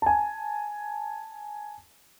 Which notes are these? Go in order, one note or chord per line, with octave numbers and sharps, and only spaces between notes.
G#5 A5